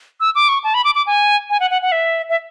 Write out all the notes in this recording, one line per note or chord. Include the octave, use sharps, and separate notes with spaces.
E6
D6
C#6
A5
B5
D6
D6
G#5
G#5
F#5
F#5
F#5
E5
E5